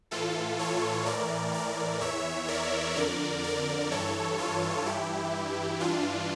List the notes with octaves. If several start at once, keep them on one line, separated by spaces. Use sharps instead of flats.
A2 E3 F4 A4
A4 C#5
A2 E3 A#4 D5
A#4 D5
E2 E3 C#5 E5
A#4 D5
F2 D3 A#4 D5
A#4 D5
G2 E3 A4 C#5
F4 A4
G2 E3 E4 G4
G2 E3 D4 F4